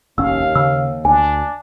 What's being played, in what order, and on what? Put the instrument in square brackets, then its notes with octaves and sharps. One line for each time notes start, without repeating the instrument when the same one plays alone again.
[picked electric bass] F1 A#1 C#4 [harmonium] D#2 [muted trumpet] F5 [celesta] E6
[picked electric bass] C#3 [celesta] E6
[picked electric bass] D2 [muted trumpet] D4 [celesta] G#5